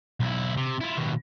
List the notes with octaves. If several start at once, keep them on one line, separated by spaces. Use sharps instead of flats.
B1 E4
C3
E4 F4
D#2 B2